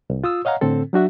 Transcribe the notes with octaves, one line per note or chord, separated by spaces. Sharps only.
C2
F4 D#6 E6
C#5 D#5 F5 F#5 A#5
A2 D3 C4 A4
F#3 D4 F#4 E5